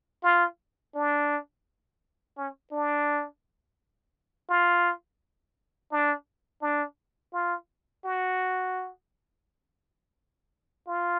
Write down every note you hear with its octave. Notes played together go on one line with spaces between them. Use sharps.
F4
D4
C#4
D4
F4
D4
D4
F4
F#4
F4